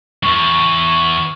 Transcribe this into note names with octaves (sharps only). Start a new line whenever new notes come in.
E2 G2 C#6